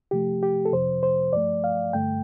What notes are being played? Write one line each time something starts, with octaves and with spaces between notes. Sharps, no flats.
C3 F3 A3 G4
G4
A4
F2 C3 F3 C5
C5
G2 F3 A3 D5
F5
G2 D3 A3 G5